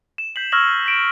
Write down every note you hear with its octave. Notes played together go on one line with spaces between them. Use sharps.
E7
G6 B6 C7 F#7
C#6 E6 F6 G#6 A#6 F#7
B6 D7 E7